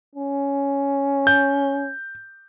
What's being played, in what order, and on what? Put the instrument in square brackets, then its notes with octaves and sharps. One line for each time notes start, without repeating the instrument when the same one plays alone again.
[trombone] C#4
[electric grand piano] G6